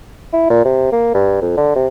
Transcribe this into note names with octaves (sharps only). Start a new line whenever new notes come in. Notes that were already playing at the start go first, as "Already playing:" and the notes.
E4
A#2
C3
A#3
G2
F2
D3
C3